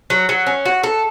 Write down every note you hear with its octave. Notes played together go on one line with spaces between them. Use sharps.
F#3
F#3
C#4
F#4
A4